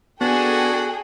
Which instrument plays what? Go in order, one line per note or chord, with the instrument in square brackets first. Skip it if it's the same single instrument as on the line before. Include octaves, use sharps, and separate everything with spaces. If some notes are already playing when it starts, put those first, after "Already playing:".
[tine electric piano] B3 [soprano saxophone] D4 [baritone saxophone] F#4 [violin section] G#4 A4 G5